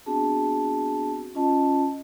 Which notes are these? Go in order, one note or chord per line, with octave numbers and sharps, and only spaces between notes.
B3 C4 D4 F#4 G#4 A5
C#4 F4 D#5 A5